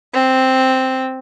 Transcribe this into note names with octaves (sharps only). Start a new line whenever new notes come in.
C4